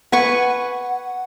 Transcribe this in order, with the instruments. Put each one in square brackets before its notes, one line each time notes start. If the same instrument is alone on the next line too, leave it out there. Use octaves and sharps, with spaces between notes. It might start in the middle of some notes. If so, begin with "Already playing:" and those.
[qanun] B4 G#5 C#6 [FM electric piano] F#5